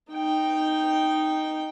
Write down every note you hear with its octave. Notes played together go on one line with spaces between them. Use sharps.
D#4 G5